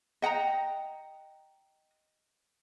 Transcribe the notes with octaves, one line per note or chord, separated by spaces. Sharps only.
D#5 F#5 G5 A#5